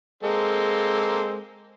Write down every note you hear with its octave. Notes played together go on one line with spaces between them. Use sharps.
G#3 A#3 C4 A4